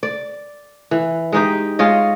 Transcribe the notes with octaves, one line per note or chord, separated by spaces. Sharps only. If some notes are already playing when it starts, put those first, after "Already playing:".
D5
E3
G#3 D#4 G4
G#3 F4 C#5 D#5